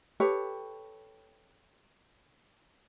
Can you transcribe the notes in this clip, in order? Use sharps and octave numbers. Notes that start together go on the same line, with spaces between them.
G4 A4 B4 C#5